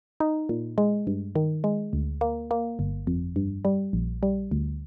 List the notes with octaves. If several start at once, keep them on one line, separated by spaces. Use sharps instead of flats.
D#4
A#2
G#3
G2
D#3
G#3
D2
A#3
A#3
G1
F2
G2
G3
A#1
G3
D2